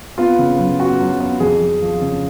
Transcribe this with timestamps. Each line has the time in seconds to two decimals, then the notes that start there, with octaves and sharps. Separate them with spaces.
0.18 B3 F4
0.39 C#3
0.59 F#2
0.79 B3 F#4
1.00 F#3
1.20 B3
1.40 F2 G#4
1.61 F2
1.82 F3
2.01 C#3